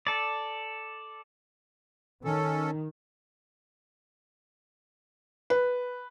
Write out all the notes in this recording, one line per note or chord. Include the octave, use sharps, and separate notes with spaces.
A4 D5
D#3 C#4 A4
B4